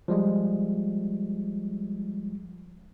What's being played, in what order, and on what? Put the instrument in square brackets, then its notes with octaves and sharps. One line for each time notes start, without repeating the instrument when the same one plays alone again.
[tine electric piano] F3 G3 G#3